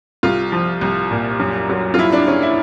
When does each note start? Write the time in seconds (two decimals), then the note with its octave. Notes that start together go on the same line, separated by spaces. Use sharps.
0.23 C2 F4
0.52 F3
0.81 C2
1.11 A#2
1.39 F#2
1.69 F#3
1.94 F4
1.98 F#2 E4
2.12 D4
2.27 C#3 C#4
2.42 E4